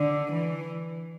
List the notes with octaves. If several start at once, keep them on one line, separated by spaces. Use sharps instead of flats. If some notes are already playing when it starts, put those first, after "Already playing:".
Already playing: D3
E3